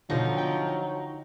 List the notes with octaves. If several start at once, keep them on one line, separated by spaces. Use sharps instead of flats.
B2 D3 F3 F#3 D#4
D3 G5